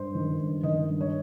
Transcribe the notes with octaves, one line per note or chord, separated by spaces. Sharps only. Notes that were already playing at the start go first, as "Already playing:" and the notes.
Already playing: G2 C5
D#3
G2
D#3 D#5
G2
C#5